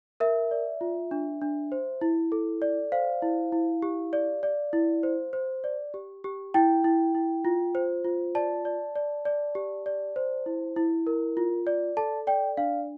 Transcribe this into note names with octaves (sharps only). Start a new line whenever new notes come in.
A#4 E5
D5
F4
D4
D4
C5
E4
A4
D5
C5 F5
E4
E4
G4
D5
D5
E4
C5
C5
D5
G4
G4
E4 G5
E4
E4
F4
C5
F4
D5 A5
D5
D5
D5
G4
D5
C5
E4
E4
A#4
F4
D5
A4 A5
D5 G5
D4 F5